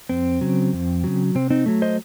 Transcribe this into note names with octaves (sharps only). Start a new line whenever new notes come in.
F2 C4
C#3 F#3
F2
C#3 F#3
C3 C4
C4 D#4
F#3 A3
C5 D#5